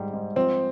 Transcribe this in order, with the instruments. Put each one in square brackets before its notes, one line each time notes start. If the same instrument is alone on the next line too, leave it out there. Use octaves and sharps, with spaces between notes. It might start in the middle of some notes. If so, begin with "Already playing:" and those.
Already playing: [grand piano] G#2 G3
G#2
[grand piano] F3 [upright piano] C4